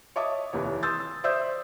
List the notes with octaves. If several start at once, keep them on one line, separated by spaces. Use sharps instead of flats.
C#5 D#5 E5 A5 D6 D#6
F1 D#2 E3 C#5
C6 D#6 E6 G6 A6
C5 D5 E5 D#6 E6 G6